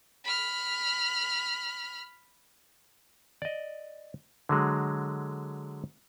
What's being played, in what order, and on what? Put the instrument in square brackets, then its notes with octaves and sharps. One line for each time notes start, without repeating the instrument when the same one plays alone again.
[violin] B5 F6
[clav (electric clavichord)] D5 D#5
D3 F#3 G#3